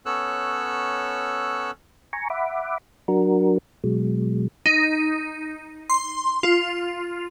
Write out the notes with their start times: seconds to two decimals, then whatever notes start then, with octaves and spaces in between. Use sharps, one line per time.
0.06 B3 C#4 A4 C#5 E6 F#6
2.13 G#5 A#5 C#6
2.30 E5 F#5 B5 D6
3.08 F#3 D4 F#4 A#4
3.84 B2 F#3 G#3
4.66 D#4
5.90 C6
6.43 F4